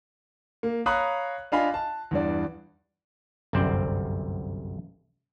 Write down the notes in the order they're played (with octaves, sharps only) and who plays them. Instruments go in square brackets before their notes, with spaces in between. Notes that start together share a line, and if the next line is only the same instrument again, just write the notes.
[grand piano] A#3
C#5 F5 A#5 B5 D#6 F#6
D4 F4 D#5 F5 G#5 B5
A5
E2 G2 D5
[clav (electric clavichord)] G1 C2 F#2 C4 C5 D5